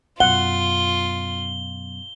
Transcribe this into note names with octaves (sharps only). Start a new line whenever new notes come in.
F#2 B2 F4 F#5 G7